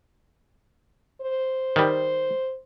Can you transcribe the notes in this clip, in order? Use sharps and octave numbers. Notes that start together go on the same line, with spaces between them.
C5
D#3 G3